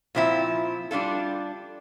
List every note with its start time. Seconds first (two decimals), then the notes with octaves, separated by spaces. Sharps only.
0.15 A#2 F3 C4 E4
0.91 G3 D4 F4 A4